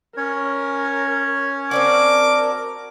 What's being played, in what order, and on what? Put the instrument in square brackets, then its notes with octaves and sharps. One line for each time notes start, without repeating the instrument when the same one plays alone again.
[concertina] C#4 C#5 [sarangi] A#4
[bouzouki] C4 D4 F#4 [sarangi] A#4 [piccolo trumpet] D6